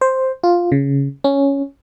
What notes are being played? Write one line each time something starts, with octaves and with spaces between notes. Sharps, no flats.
C5
F4
C#3
C#4